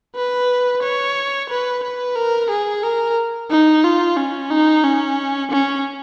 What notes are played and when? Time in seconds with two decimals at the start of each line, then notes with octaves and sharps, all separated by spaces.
0.15 B4
0.82 C#5
1.49 B4
1.83 B4
2.16 A#4
2.50 G#4
2.83 A#4
3.50 D#4
3.84 F4
4.17 C#4
4.50 D#4
4.84 C#4
5.51 C#4